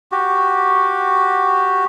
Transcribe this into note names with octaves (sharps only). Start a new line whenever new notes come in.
F#4 G4